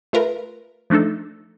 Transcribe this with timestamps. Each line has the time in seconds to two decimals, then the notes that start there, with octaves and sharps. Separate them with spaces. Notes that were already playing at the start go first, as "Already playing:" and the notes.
0.13 A3 F4 A#4 B4
0.90 F3 A3 D4 D#4 A4